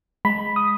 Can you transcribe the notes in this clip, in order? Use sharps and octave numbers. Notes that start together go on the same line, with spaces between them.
G#3 B5
D#6